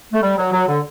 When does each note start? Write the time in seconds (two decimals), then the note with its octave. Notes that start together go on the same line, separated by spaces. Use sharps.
0.13 A3
0.22 G3
0.38 F#3
0.53 F#3
0.68 D3